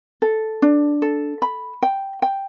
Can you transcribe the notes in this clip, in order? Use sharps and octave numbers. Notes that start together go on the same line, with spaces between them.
A4
D4
A4
B5
G5
G5